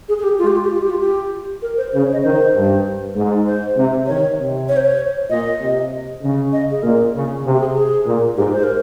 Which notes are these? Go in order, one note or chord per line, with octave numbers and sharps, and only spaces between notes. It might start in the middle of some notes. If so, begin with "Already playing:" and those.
G#4
G#4
G4
G#3 F4
G4
F4
G4
F4
G4
F4
G4
A#4
C5
C#3 C5
C#5
D#5
D#3 C5
G2
G#2
C5
C3
D#3 C#5
C3
C#5
C5
C#5
A#2 D#5
C3
C#3
D#5
G#4
A#2 A#4
C#3
C3
G4
G#4
G#4
A#2
G#2 G4
C5
A#4